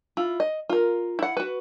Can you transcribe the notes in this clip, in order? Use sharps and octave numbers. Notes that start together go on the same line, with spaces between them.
E4 F4
D#5
F4 A#4
E4 F#5
F#4 B4